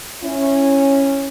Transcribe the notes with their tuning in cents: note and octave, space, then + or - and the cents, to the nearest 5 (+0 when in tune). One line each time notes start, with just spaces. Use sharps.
C#4 -10 E4 +5